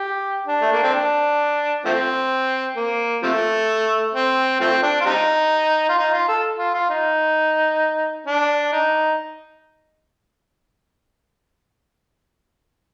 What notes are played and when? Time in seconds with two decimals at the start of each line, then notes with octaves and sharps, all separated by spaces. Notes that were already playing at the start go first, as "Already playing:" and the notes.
Already playing: G4
0.47 D4
0.61 A3
0.72 A#3
0.83 C4
0.92 D4
1.85 F3 A3 C4
2.76 A#3
3.22 C3 F3 A3
4.14 C4
4.60 F3 A3 C4
4.83 D4
5.01 F4
5.05 G3 C4 D#4
5.89 F4
5.98 D#4
6.14 F4
6.28 A4
6.58 F4
6.74 F4
6.90 D#4
8.27 D4
8.73 D#4